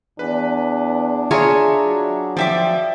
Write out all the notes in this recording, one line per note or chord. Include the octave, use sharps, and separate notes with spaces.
E2 D4 B4
F4 G#4 C#5 E5 A#5 C#7
F#3
F3 D5 E5 G5 D6 B6